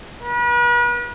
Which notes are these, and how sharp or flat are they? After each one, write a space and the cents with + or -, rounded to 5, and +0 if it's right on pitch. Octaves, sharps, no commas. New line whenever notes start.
B4 -40